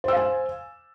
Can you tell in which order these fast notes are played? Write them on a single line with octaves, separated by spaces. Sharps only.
C5 E6 F5 G#5